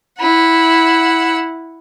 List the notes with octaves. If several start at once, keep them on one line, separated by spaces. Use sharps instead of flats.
E4 F#5